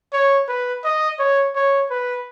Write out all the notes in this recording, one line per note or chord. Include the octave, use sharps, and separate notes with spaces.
C#5
B4
D#5
C#5
C#5
B4